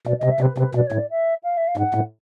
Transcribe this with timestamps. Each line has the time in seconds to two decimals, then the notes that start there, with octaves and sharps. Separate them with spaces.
0.06 B2 D5
0.19 D#5
0.24 C3
0.30 E5
0.41 C3 B4
0.58 C3 B4
0.75 B2 D5
0.86 C#5
0.92 A2
0.98 D5
1.10 E5
1.43 F5
1.57 E5
1.67 F5
1.77 G#2 F#5
1.95 A2